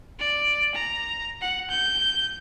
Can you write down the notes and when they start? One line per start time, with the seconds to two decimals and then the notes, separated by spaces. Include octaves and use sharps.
0.19 D5
0.75 A#5
1.41 F#5
1.71 G6